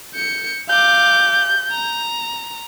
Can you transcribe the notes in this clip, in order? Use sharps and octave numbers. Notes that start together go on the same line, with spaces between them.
G6 C#7
F5 D6 G6
A#5